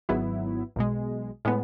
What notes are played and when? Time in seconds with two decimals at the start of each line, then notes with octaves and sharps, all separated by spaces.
0.09 G#1 G#2 F#3 B3 E4
0.76 B1 B2 G#3
1.45 A2 G#3 B3